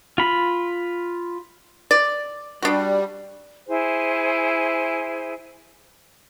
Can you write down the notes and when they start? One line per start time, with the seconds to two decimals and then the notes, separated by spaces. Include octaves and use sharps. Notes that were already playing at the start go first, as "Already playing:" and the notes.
0.18 F4 B5
1.91 D5
2.62 G3 D4 F#4
3.68 E4 G#4 C5 G#5